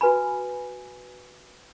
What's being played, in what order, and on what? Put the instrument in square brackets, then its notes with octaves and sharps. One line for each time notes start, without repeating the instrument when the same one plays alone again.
[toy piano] F#4 B4 G#5 B5